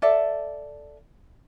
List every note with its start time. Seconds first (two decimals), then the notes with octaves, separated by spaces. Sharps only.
0.02 A4 D5 E5